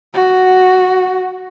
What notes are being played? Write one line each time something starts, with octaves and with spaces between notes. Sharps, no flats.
F#4